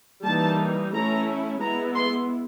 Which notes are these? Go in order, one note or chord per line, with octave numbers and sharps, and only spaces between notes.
E3 G3 A#3 D#4 A5
A3 C#4 E4 A#5
G#3 B3 E4 A#5
C6